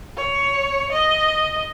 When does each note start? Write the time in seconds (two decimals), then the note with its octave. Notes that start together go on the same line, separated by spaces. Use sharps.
0.16 C#5
0.91 D#5